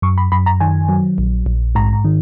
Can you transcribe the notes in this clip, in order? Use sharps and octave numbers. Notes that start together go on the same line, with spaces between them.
F#2 C#6
B5
F#2 B5
A#5
D#3 G#5
F#3
A#1
A#1
G#2 A#5
D#3